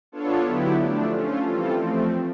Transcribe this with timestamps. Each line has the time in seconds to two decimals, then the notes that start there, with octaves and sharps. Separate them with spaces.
0.12 B3 D4 F4 A4 C#5
0.45 D3 F#3 B3 E4 G4
0.79 F3 A3 D4
1.12 A3 C#4 F4
1.45 E3 G3 C4 F4 A4
1.79 F3 A3 C4